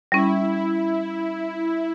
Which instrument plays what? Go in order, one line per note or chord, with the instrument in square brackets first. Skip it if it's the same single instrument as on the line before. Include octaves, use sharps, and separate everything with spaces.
[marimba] G3 C#4 [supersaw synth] E4